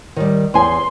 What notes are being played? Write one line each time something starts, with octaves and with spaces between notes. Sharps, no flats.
D#3 G3
E2 G#5 C6